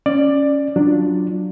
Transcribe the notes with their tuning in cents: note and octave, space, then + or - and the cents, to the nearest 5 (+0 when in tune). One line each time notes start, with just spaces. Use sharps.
C#4 +0 D5 +15
F#3 +0 D4 +0 F4 +0